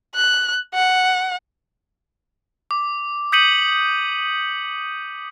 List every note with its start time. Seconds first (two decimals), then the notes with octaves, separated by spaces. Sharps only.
0.15 F#6
0.75 F#5
2.71 D6
3.32 D#6 G6 B6 C#7 D#7 F#7